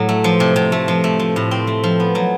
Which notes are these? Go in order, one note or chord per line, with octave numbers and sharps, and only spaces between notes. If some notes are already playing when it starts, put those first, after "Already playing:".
Already playing: A2 F#3
A3
F3
C3
C3
A3
F3
A3
F3
A2
C4
A3
F3
B3
F#3